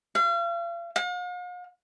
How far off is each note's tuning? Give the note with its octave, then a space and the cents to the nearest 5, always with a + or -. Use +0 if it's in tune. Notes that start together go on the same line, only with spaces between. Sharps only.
F5 -40
F5 +45